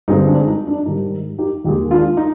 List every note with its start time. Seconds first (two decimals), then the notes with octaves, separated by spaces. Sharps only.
0.08 G2 D3 G#3 C4 D#4
0.28 D4
0.47 D#4
0.67 D4
0.86 G#2 D#3 G3 D#4
1.38 D#4 G4
1.64 D#2 D#3 G#3 D#4 G4
1.91 D4 F4
2.17 D#4